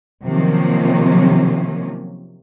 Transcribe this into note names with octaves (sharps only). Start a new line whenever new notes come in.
C3 D#3 F3 F#3 A#3 C#4